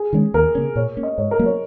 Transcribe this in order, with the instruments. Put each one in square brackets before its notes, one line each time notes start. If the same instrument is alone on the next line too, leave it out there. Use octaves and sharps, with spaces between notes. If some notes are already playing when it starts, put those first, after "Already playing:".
Already playing: [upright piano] G#4
[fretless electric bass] D#3 G#3 C#4
[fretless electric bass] D#2 [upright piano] A#4
[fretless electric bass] C#3 A#3 C#4
[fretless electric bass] A#2 [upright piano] C#5
[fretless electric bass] A#3 C#4
[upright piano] D#5
[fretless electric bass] G#2 [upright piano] C#5
[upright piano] A#4
[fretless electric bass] F#3 A#3 C#4
[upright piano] C#5